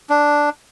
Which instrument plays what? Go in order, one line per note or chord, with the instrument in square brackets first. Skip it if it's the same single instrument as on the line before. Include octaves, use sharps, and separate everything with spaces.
[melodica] D4